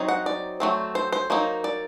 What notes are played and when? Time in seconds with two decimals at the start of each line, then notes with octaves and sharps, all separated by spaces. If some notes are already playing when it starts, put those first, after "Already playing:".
Already playing: F#3 C4 D#4
0.09 F#5
0.26 D5
0.60 F#3 A3 C4
0.95 C5
1.12 C5
1.30 F#3 A#3 D#4
1.64 D5